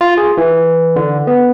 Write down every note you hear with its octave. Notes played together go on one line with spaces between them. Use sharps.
F4
G#4
E3
D3
B3